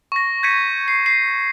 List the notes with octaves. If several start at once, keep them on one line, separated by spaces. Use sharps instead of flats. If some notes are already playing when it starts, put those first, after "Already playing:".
C#6 A#6
G6 G#6 A#6 B6 C#7 D#7
C7
C7 D#7